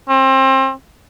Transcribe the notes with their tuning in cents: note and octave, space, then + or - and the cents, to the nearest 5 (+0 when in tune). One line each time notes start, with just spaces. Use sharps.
C4 +30